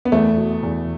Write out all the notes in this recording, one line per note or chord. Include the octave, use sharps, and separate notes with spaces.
B3
E2 A3
B2
E2